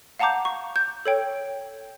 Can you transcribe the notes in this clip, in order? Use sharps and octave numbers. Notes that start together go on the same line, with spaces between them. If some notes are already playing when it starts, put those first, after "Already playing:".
F5 F#5 A5 A#5 D6 G6
C#6
G6
A4 C#5 G5